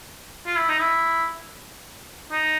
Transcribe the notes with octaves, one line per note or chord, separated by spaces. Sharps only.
F4
E4
D#4
E4
D#4